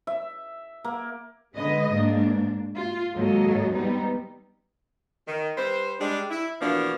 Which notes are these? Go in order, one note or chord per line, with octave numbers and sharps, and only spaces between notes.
E5
A#3
D3 G#3 B4 D#5
G#2 A#3 D4
F4
D#2 G#2 F#3 A#3 A4 D#5
G3 B3 C4 D#4
D#3
G3 B4 C5
G3 G#3 D4
E4
B2 E3 F3 A#3 D4